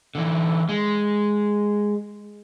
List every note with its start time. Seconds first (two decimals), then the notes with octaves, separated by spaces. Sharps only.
0.15 D3 E3
0.69 G#3